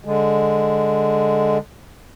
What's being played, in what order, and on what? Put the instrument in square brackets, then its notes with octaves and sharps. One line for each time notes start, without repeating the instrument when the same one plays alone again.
[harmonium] D3 G#3